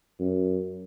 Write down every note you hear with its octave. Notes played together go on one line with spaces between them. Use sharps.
F#2